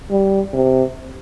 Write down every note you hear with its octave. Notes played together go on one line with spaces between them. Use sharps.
G3
C3